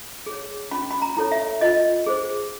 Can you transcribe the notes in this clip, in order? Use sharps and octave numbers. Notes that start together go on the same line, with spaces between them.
G#4 C#5
C#4 B5
B5
A#5
E4 A4 C#5
E5
F4 D#5
G#4 C5